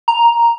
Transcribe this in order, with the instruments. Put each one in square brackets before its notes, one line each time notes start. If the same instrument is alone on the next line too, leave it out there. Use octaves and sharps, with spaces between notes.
[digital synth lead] A#5